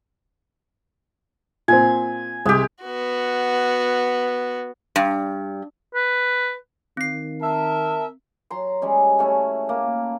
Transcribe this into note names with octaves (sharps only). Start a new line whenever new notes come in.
A#2 C4 G#5
C2 G#3 G4
B3 F#4
G2
B4
D#3 C4 C7
A#4 E5 A5
F#3 A#5 C6
G3 G#3 C#4
A3 C#4 E4
A#3